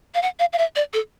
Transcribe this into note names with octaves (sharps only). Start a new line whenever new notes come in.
F5
F#5
F5
F5
E5
D5
A4